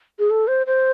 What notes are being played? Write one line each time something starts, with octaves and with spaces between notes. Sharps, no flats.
G#4
A4
C5
C5